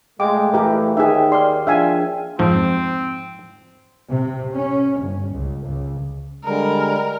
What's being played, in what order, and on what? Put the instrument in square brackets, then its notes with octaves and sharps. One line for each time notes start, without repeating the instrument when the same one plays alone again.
[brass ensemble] A#2 A3 [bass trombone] G#3 [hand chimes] F5 G5 [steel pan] D6
[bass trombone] E3 [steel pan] G4 A#4
[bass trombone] D#2 [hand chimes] D#4 A#4 [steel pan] G#4 E5 [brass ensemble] D#5 G5
[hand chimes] D5 D6 F6 [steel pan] C6
[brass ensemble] D#2 F3 [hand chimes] D4 G#4 G5 [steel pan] E5 F5 G#5
[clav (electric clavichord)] F2 G#2 F3 [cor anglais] C4
[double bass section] C3
C#4
G1
C#2
C#2
[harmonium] D3 G3 G#3 [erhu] A#4